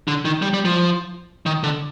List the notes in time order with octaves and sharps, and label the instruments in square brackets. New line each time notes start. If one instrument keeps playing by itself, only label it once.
[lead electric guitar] D3
D#3
G3
G3
F3
D#3
D3